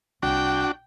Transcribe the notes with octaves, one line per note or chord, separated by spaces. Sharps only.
C2 D4 F#4 G5